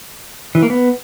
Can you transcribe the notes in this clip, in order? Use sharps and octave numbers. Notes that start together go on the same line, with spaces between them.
E3
A#3
B3